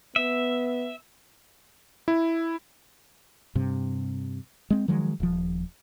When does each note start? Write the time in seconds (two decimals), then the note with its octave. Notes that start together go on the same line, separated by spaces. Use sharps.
0.16 B3 E5
2.08 E4
3.55 G2 C3
4.70 G#3 C4
4.88 D#3 F3 F#3 G#3
5.20 D#1 F3